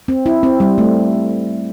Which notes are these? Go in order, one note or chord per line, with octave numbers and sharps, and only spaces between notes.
C4
E4
C4
G3
A3